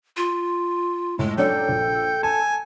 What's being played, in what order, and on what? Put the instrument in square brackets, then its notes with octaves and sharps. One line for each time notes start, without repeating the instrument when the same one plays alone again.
[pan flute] F4
[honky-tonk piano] A2 [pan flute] G#3
[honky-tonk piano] F#3 C#4 D4 [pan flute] A4 [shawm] G5
[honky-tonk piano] A#1
[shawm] G#5 [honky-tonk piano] A5